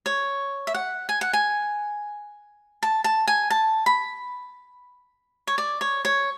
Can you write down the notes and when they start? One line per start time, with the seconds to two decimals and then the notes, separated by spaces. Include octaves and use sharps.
0.06 C#5
0.67 E5
0.74 F#5
1.09 G#5
1.21 F#5
1.33 G#5
2.83 A5
3.04 A5
3.27 G#5
3.50 A5
3.86 B5
5.47 C#5
5.58 D5
5.81 C#5
6.05 C#5